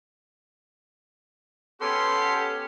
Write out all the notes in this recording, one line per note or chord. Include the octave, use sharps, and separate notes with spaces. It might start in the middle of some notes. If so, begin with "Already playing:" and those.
B3 C#4 G4 A4 C6